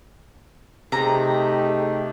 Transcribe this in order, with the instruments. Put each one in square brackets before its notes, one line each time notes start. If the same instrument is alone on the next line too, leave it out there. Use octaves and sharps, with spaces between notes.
[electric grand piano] C3 [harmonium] A3 D#4 G4 [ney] G#4 [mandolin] A#5